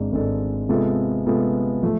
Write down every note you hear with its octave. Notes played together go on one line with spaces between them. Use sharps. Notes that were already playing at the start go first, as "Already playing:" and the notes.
Already playing: G#1 G#2 G#3 D4
G#1 G#2 G#3 D4 A4
C3 G#3 B3 F4 A4
C3 G#3 B3 F4 A4
F3 A3